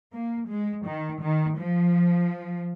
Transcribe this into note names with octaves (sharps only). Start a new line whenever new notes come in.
A#3
G#3
D#3
D#3
F3